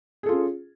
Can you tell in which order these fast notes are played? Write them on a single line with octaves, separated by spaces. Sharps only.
G#4 A4 F4 C#4